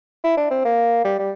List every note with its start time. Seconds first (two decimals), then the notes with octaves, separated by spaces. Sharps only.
0.24 E4
0.37 D4
0.51 C4
0.65 A#3
1.05 G3
1.19 G3